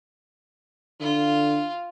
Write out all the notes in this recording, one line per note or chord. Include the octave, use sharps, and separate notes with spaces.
D3 F4